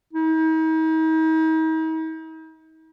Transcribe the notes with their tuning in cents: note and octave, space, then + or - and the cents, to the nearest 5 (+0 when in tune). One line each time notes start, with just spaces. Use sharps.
D#4 +40